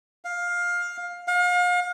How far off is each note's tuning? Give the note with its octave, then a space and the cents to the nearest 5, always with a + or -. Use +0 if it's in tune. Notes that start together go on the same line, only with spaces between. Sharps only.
F5 +15
F5 +40